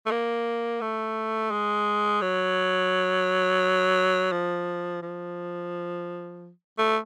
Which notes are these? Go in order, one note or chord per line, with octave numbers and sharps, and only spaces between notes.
A3
A#3
A3
G#3
F#3
F3
F3
A3